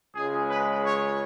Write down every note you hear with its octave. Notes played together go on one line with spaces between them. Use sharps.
C#2 C#3 G#3 G#4
B4
C#5